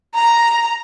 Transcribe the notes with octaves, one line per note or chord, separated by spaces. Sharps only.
A#5